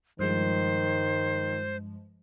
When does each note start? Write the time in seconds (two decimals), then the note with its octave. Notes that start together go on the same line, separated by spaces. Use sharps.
0.19 G2 D#3 F3 G#3 C5